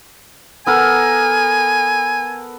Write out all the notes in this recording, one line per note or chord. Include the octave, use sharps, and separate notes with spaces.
B3 A4 A#4 G#5